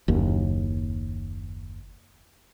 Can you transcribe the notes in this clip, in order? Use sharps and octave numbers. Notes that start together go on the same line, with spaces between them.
F#1 D#2